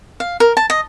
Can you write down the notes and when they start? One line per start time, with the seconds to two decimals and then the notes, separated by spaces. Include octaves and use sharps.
0.20 F5
0.40 A#4
0.57 A5
0.70 D#5